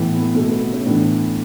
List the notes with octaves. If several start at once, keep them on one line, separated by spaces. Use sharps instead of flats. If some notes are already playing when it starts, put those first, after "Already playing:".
Already playing: A2 E3 B3
B3
B2 A3
B3
B3
A3 C#4
A2 E3 B3 D4